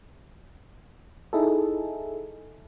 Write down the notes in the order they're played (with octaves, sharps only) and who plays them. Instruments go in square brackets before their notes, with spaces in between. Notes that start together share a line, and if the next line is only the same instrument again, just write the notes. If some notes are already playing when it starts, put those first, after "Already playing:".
[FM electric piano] D#4 E4 G#4 A4